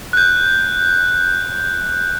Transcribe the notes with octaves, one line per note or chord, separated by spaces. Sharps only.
F#6 G6